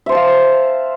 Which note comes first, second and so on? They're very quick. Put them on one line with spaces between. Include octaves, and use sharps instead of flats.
E5 C5 A5 F5